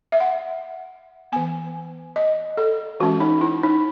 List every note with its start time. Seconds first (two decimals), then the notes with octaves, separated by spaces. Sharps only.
0.12 E5
0.20 F#5
1.32 E3 B3 G#5
2.16 D#5
2.57 A4
3.00 E3 G#3 C#4 F#4
3.20 D#4
3.41 E4
3.63 D#4